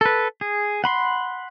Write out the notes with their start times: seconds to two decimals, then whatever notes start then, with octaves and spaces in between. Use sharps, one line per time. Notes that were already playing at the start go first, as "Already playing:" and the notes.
0.01 A4 B4
0.41 G#4
0.84 F#5 B5 C6